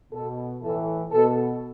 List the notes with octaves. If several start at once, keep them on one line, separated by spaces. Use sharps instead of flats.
B2 A4
A2 E3 A4
B2 A4